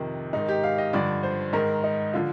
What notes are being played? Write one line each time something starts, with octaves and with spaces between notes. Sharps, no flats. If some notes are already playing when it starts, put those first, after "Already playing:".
Already playing: F2 C3 D#3
G#2 D#3 D#4
G4
F5
D#5
G2 D3 F3 D5
C5
G#2 D#3 A#4
D#4
D3 F3 F4